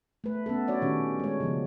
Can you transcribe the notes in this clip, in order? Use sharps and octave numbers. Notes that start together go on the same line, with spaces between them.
A3 B4
B3 C#4 A4
D4 F#4 C#5 D5
A#2 D#3 C#4 D4 G4
G#3 C#5
C#3 F3 B3